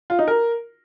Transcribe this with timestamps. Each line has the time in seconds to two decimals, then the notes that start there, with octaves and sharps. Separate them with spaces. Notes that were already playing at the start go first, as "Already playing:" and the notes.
0.10 F4
0.19 D#4
0.28 A#4